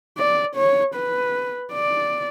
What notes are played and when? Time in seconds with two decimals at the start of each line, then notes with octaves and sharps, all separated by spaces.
0.18 D5
0.56 C#5
0.95 B4
1.72 D5